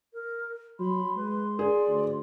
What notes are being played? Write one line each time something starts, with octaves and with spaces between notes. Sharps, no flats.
A#4
F#3 B5 C6
G#3 B4
G#4 D5
D2